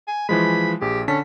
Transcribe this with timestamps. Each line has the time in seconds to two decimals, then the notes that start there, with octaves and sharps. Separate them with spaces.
0.08 G#5
0.29 E3 F3 G#3 B5
0.82 A#1 G4 G#4
1.08 D3 C#4 A5 B6